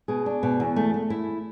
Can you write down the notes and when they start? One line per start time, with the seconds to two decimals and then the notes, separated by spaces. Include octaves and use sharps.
0.08 B2 G#4
0.26 D4
0.43 B2
0.60 E2
0.76 A3
0.94 A3
1.10 E4